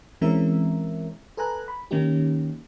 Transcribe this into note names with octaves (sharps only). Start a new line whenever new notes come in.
E3 G#3 C4 C#4 A#4 E5
A4 B4 G#5 A#5 F#6
B5
D#3 A#3 C#4 D#4 G4